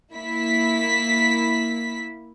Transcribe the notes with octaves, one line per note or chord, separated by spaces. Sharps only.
A#3 E4 B6